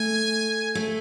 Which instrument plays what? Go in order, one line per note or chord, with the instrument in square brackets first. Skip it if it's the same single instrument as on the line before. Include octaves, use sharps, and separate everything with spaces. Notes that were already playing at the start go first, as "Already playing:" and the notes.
Already playing: [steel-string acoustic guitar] A3 [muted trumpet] G#5
[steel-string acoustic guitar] A3